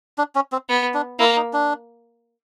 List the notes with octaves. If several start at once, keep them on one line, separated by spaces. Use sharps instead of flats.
D4
C#4
C4
B3
D4
A#3 E4
D#4
D4